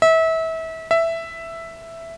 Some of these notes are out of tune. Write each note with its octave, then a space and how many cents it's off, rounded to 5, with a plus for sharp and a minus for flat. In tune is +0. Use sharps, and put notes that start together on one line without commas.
E5 -30
E5 +5